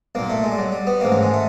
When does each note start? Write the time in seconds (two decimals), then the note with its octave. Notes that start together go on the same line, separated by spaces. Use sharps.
0.15 B1 A#2 A#3
0.30 A3
0.43 G#3
0.52 G3
0.59 F#3
0.72 G3
0.87 B3
1.01 A1 G#2 D#3 A#3
1.12 F#3
1.23 G#3
1.34 A3